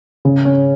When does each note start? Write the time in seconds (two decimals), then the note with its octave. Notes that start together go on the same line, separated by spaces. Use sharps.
0.25 C#3
0.45 C#4